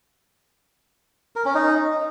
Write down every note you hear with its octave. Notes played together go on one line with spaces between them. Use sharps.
A#4
C#4
D#4